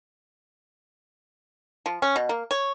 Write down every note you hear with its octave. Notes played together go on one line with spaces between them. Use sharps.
F3
C#4
B2
A#3
C#5